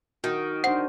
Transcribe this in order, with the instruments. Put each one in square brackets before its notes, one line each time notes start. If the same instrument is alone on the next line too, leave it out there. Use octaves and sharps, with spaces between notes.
[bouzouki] D#3 [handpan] F#4
[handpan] D4 C5 [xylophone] F#5